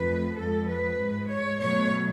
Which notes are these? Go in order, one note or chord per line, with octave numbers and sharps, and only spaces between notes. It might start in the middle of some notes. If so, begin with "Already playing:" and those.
Already playing: F2 F3 A3 B4
F2 F3 G#3 A4
B4
G#2 G#3
C#5
B2 F#3 A3 C#5